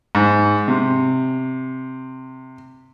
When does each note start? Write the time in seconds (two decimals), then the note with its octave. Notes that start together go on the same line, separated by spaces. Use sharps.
0.15 G#2
0.68 C3